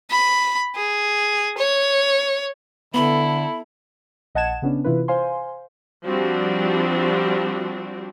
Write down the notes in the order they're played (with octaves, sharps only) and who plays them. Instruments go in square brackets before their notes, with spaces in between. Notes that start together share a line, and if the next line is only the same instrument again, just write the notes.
[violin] B5
G#4
C#5
[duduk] D3 [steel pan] B3 [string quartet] E4 A4 [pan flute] B5
[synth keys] A#1 D#5 F#5 A5 G#6 E7
C#3 B3 C#4 D4
C3 E3 E4 F4 B4
C5 F5 G#5 C6
[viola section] F3 G3 C4 D4 F#4